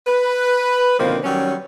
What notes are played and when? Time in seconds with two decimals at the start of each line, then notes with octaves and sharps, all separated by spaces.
0.07 B4
0.99 B2 D3 D#3 F3 A#3 C4
1.24 D#3 F#3 G3 C#4